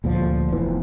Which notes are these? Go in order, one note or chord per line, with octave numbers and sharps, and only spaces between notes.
D2 A#2 D3 F3
F1 E3 B3